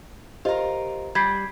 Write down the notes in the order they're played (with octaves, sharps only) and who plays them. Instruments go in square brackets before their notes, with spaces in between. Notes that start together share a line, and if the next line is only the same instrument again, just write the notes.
[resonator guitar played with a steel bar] F4 A#4 [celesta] G4 C5 D#5
[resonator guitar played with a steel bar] G3 [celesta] G#6 B6 C7